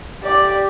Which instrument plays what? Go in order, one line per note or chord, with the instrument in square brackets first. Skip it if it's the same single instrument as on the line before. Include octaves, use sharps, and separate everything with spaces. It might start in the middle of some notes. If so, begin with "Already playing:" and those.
[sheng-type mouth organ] G4 [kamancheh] D5